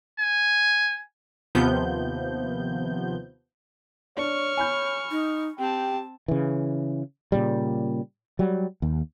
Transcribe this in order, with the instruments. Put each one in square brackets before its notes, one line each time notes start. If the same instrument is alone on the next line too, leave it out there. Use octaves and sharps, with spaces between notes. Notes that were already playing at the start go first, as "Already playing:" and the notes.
[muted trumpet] G#5
[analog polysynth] D#2 C3 F3 B3 G6
[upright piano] D4 [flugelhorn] C#5 [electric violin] C#6 F6
[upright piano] G#5 B5 G6
[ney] D#4
[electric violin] C4 A5 [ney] G4 [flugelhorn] G5
[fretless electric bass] C#3 E3
A#2 C#3 G3
F#3 G3
D#2